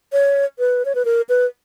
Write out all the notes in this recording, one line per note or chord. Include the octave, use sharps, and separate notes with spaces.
C#5
B4
C#5
B4
A#4
B4